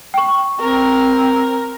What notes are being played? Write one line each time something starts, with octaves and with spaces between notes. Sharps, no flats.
G5 C#6
C4 A#4